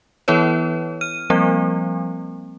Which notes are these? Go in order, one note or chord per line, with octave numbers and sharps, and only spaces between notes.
E3 B3 E4 B4 C#5
F6 D#7
F3 G3 A#3 C4